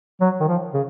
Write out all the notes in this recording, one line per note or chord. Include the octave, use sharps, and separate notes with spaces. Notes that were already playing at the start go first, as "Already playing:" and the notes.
F#3
D#3
F3
C#3